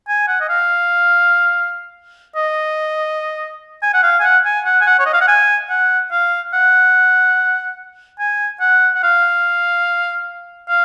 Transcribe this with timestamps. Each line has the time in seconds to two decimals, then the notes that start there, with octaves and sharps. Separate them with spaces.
0.08 G#5
0.28 F#5
0.41 D#5
0.49 F5
2.36 D#5
3.83 G#5
3.94 F#5
4.03 F5
4.20 G#5
4.23 F#5
4.45 G#5
4.65 F#5
4.81 G#5
4.86 F#5
4.99 C#5
5.06 D#5
5.13 F5
5.21 F#5
5.28 G#5
5.70 F#5
6.12 F5
6.53 F#5
8.19 G#5
8.61 F#5
8.95 F#5
9.03 F5
10.69 F5